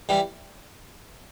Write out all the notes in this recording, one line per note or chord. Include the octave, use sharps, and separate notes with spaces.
E3 G3